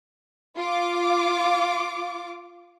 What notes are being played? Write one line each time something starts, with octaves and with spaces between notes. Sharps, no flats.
F4 D6